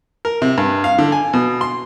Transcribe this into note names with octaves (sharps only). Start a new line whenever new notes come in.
A#4
C3
G2
F5
D3
G#5
B2
C6